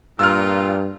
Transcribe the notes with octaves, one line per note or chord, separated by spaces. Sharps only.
G2 A#2 F4 E6 F6